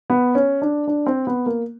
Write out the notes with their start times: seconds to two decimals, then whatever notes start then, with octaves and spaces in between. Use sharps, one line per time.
0.10 B3
0.35 C#4
0.62 D4
0.87 D4
1.06 C4
1.27 B3
1.46 A#3